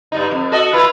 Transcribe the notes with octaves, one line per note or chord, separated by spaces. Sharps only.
G2 G3 D#4
F2
F#4 A4 D#5
E4 F4 B4